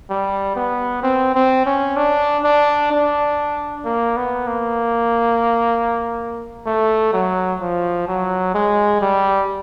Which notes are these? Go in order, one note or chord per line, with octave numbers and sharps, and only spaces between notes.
G3
B3
C4
C4
C#4
D4
D4
D4
A#3
B3
A#3
A3
F#3
F3
F#3
G#3
G3